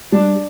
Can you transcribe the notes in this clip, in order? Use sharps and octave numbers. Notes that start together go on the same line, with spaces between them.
G3 D4